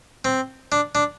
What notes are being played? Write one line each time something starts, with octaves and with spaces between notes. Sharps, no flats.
C4
D4
D4